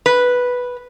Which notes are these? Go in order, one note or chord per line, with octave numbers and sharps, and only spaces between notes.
B4